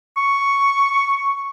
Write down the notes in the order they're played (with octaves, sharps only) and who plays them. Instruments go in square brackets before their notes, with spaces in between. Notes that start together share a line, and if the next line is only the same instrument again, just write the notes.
[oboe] C#6